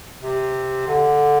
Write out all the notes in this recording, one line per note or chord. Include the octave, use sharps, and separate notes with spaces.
C3
D3